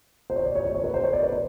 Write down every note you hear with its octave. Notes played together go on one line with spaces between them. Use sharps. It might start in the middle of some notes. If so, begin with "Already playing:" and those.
C5
C#5
D5
C#5
C5
C#5
B4
C5
C#5
D5
B4
C5